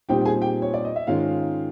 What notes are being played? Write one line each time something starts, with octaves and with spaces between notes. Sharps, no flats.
A#2 G3 C4 D#4 G4 G5
G5
G#4 G#5
G4 G5
C#5
D5
D#5
E5
G#2 D#3 G#3 C#4 F4 F5